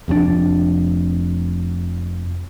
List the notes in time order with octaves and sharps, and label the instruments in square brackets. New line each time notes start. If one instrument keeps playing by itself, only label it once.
[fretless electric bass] F1 F2 G#2 D4